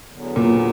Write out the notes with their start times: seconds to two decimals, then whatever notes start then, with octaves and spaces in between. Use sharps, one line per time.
0.13 E2 D3 F#3 B3
0.36 A#2